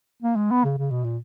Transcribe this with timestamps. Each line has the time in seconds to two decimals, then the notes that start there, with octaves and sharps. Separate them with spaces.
0.22 A#3
0.36 G#3
0.51 B3
0.64 C#3
0.78 C#3
0.91 B2
1.04 A#2